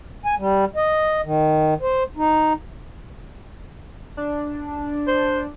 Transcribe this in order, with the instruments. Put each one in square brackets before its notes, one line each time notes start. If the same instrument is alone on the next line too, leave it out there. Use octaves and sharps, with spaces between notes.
[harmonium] G#5
G3
D#5
D#3
C5
D#4
[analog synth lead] D4
[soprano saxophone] C5